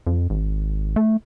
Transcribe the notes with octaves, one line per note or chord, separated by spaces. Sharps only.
F2
G#1
A3